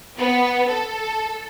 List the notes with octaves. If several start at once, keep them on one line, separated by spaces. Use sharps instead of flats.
B3
A4